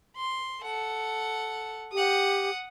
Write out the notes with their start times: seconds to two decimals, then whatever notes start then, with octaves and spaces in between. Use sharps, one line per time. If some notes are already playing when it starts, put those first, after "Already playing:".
0.17 C6
0.62 A4 F#5
1.93 G4 F#5 D#6